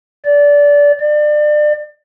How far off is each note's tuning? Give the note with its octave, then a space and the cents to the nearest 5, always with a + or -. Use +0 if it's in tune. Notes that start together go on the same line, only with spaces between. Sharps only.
D5 -20
D5 +30